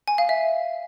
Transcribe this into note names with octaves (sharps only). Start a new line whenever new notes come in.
G#5
F5
E5